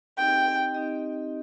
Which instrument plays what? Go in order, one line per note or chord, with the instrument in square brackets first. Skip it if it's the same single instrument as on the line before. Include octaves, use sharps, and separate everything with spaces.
[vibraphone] C4 D#4 G4 D#5 [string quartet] G5
[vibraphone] C4 D#4 G4 D#5